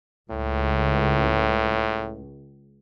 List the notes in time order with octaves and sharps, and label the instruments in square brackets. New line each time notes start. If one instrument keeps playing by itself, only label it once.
[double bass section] C#2 [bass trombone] A2